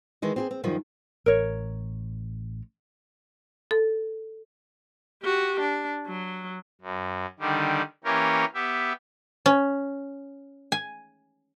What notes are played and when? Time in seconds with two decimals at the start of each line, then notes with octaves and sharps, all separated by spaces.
0.22 D#3 E3 G#3 D#4
0.36 C4 G4 G#4
0.51 C4
0.64 F#2 D#3 F3 G3
1.26 A1 A#4 C#5
3.71 A4
5.23 F#4 G4
5.60 D4
6.07 F#3
6.82 F#2
7.40 D3 D#3 G3
8.04 E3 A#3 C#4 G4 A#4 C#5
8.54 B3 G4 E5
9.46 C#4
10.72 G#5